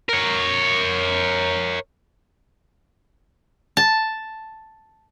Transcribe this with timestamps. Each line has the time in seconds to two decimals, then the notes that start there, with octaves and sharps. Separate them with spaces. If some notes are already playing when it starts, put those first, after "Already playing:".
0.09 A#4 C#5
3.77 A5